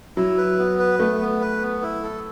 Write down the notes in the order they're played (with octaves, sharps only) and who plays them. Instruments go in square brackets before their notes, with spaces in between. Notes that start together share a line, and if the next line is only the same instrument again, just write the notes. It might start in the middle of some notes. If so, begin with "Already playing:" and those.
[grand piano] F#3 [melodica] E4
[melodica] B4
B3
B4
[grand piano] A3 [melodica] B3
[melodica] B3
B4
B3
E4
A4